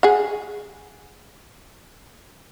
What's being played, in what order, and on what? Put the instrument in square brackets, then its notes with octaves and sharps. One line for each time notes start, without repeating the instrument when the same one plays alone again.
[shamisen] G#4 F#5